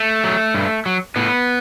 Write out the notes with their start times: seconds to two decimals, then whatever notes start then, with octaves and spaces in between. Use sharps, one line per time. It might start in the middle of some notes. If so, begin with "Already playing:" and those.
Already playing: A3
0.24 F#3
0.55 G2
0.86 F#3
1.16 A2 B3